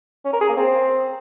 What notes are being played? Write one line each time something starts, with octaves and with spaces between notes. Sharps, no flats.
C#4
A#4
G#4
A#3
C4